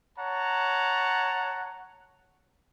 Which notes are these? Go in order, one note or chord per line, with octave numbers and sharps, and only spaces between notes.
C#5 F#5 A5 A#5